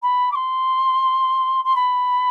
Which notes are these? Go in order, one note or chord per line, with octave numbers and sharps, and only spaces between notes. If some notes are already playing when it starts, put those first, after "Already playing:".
B5
D6
C6
C6
B5